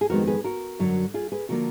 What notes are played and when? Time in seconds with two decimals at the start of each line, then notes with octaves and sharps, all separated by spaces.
0.01 G#4
0.10 F2 D#3 G#3 B3 F#4 A#4
0.27 G#4 B4
0.44 F#4 A#4
0.79 F#2 D3 F#3
1.14 F4 G#4
1.32 G#4 B4
1.49 D3 F3 A#3 F#4 A#4